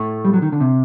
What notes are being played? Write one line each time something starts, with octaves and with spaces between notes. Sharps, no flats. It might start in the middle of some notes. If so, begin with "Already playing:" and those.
Already playing: A2 A3
G3
F#3
D#3
D3
C3